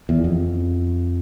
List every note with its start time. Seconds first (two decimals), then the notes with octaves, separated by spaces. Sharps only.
0.09 E2
0.24 F2